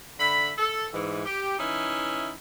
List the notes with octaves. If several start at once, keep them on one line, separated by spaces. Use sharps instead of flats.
D3 E5 B5
A4
G#2 E3
G4
E3 C#4 D#4 E4